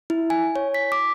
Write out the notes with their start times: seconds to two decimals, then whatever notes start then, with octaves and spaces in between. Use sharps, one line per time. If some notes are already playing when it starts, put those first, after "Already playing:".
0.10 E4
0.30 G#5
0.56 C#5
0.74 B6
0.92 D6